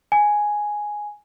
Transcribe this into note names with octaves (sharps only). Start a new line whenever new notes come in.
G#5